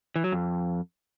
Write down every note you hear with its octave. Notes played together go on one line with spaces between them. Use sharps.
E3
F#3
F2